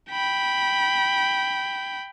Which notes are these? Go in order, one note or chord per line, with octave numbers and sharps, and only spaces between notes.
G5 B5